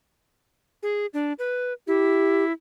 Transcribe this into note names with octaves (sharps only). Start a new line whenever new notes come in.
G#4
D4
B4
E4 G4